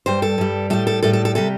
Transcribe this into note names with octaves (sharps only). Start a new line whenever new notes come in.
G2 G3 C5
A4
G2 G3
A2 G3 A4
A4
A2 G3 A4
A4
A4
C3 G3 A4